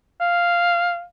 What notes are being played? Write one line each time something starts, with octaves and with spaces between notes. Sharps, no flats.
F5